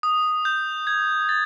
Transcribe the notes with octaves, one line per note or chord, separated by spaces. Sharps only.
D#6
G6
G#6
A6